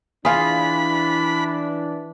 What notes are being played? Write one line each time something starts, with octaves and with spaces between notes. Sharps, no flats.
E3 D4 F4 G#4 B5